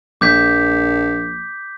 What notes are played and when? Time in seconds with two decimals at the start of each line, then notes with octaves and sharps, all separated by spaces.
0.21 A#1 D6 G6 B6